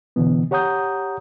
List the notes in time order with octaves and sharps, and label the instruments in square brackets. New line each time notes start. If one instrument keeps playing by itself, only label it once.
[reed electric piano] B2 D3 E3 B3
G4 C#5 F#5 A#5 D#6 G6